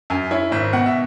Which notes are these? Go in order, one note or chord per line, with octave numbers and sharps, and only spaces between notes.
F#2 G#5
E4 C#5
G#1 E5
B2 F#5
E5